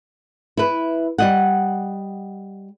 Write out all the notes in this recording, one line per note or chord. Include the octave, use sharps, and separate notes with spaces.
E4 B4
G3 D#5 F#5